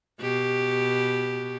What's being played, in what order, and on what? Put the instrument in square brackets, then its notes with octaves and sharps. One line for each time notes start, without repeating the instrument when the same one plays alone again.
[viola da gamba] B2 G4